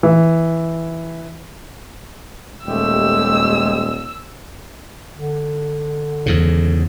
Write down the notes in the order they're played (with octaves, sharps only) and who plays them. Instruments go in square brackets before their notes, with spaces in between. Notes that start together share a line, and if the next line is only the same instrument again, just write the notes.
[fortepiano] E3
[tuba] D#1 [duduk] G#3 [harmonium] A3 G4 [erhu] E6
[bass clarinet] D3
[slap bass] E2 G#2 C#3